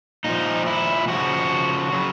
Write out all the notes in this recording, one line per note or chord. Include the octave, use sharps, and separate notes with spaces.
A#2 F3 D#4
E4
C#3 F3 F#4
C#3 F#3